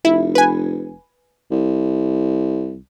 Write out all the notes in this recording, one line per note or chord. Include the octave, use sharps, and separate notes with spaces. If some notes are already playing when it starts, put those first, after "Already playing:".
F1 E4
B4 G#5
C2